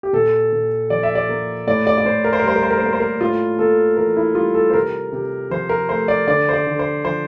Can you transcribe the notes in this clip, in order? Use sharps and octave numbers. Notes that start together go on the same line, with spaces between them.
G4
A#2 A4
A#2
F3 D5
E5
D5
A#3
A2 D5
D5
D5
A2 C5
A#4
C5
A#4
G3 C5
A#4
C5
A#4
C5
A#3 A#4
C5
A#4
A2 F4
A#3 A4
E3 A#4
E4
G3 F4
A4
C5
C3 A#4
C3
F3 C5
A#4
A3 C5
D5
D3 D5
C5
D5
D3
C5
F3 C5